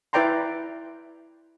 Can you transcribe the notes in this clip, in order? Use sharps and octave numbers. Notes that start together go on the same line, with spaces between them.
E4 B4 D5 G5 A#5 C6